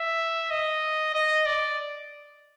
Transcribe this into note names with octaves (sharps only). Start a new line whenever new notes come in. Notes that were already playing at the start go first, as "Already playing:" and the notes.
Already playing: E5
D#5
D#5
D5